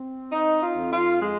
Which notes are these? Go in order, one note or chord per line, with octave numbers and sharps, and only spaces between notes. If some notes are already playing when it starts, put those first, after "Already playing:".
Already playing: C4
C4 D#4
F4
F2
F4
G#3 G#4